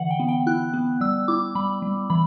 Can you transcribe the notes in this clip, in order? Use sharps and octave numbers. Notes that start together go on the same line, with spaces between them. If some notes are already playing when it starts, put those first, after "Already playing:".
Already playing: D3 E3 F#5
G5
B3
G5
E4 F#6
B3
G3 E6
E4 D6
G3 B5
G3
E3 B5